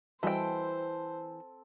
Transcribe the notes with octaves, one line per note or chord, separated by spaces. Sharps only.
E3 G3 C4 F#4 A4 C5 D#5 G5